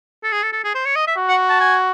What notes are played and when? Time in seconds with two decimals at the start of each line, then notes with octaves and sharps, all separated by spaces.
0.24 A4
0.32 G#4
0.42 A4
0.53 A4
0.64 G#4
0.75 C5
0.85 C#5
0.96 D#5
1.07 E5
1.17 F#4
1.28 F#5
1.49 A5
1.60 G#5